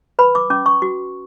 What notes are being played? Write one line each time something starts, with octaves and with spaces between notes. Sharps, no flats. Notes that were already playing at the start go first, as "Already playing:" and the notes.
B4 B5
D6
C#4 D6
C#6
F#4